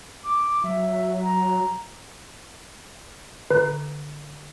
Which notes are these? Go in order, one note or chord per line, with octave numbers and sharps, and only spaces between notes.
D6
F#3 E5
A#5
D3 B4